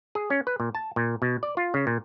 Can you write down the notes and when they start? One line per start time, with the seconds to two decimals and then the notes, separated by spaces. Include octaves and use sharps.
0.15 G#4
0.30 C#4
0.47 B4
0.60 A#2
0.75 A5
0.96 A#2
1.22 B2
1.43 D5
1.57 F4
1.74 C#3
1.87 A#2